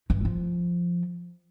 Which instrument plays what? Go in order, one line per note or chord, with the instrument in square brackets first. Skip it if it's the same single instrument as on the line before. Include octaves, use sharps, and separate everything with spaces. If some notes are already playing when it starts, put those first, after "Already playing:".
[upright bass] G2
F3